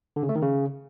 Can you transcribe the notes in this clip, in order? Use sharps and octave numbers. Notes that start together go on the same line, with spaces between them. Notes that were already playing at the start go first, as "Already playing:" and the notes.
D3
C#3
A3
D#3
C#3